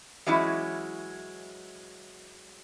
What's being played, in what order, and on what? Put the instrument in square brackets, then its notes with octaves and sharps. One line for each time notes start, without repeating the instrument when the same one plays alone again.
[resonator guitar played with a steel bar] E3 F#3 G#3 C#4 E4